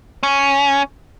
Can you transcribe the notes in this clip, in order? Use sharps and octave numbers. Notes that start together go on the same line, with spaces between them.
C#4